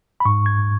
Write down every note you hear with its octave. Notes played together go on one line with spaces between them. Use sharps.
B5
G#2 C#6
G#6